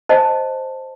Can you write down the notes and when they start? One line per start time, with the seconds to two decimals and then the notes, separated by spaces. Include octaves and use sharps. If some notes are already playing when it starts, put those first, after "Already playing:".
0.09 C5 D#5 G#5 A5